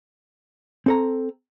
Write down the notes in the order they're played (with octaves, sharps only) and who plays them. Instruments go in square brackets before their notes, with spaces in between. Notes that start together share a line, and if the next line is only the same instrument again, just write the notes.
[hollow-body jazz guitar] C4 A4 A#5